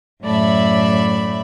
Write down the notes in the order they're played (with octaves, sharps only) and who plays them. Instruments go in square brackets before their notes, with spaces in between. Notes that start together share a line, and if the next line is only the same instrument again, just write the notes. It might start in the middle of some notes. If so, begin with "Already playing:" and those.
[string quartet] F#2 A2 A3 D5 E5 B5